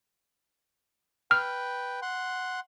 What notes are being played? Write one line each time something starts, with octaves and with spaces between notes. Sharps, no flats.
B4 G5 F6
F#5 C6